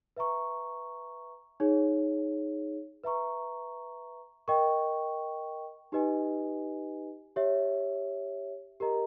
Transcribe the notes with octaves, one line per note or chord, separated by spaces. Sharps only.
B4 E5 A#5 C#6
D#4 G#4 C#5
B4 E5 A#5 C#6
A#4 D#5 G5 C#6
D#4 G4 B4 D#5 G#5
G4 C#5 E5
G4 A#4 D#5 A#5